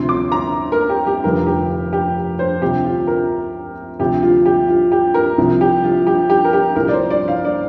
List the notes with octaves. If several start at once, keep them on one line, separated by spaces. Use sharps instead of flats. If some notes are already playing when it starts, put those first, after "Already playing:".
Already playing: D2 C3 F3 C6
D6
A#5
A#4
G4
G4
F1 F2 D3 F3 A#4
G4
G4
C5
D2 C3 F3 G4
F4
A#4
D2 C3 F3 G4
F4
G4
F4
G4
A#4
C2 C3 F3
G4
F4
G4
G4
A#4
G4
C2 A#2 F3 A#4
D5
C5
D5
F5
D5